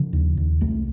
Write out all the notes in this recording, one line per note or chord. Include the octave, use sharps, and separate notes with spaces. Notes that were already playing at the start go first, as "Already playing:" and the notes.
Already playing: C#3 F3
D#2
D#2
C2 A3